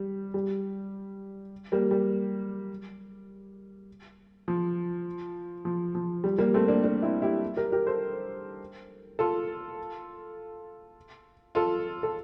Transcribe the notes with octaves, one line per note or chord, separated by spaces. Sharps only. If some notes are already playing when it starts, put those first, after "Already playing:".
Already playing: G3
G3
G3 A#3
G3
F3
F3
F3
G3
G3 A#3
A3 C4
A#3 D4
A#3 D4
C4 E4
E4 G4
G4 A#4
G4 A#4
A4 C5
F4 A4
F4 A4
A4